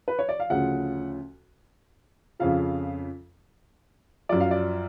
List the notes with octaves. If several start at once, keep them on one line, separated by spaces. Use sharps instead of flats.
B4
C#5
D5
F5
D2 C#3 F3 F#5
F2 C#3 F3 F5
F#2 F3 D5
F5
D5